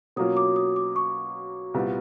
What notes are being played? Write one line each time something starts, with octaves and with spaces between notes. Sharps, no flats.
B2 F#3 A#3 C#4 F4 D#6
D6
D#6
D6
C#6
C2 A#2 G3 B3